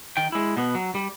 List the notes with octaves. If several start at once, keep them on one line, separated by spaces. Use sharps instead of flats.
D#3 G5
G#3 E4
B2 B3
F#3
G3